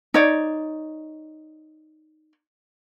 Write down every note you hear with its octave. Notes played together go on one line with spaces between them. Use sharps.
D#4 C#5 D5